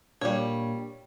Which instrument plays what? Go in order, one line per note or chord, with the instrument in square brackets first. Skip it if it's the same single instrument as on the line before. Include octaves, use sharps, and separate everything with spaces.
[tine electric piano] A#2 A#3 D4 [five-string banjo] G3 C#5